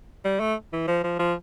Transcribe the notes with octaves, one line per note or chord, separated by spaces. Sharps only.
G3
A3
E3
F3
F3
F3